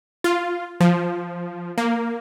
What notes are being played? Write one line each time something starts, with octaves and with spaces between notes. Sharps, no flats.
F4
F3
A#3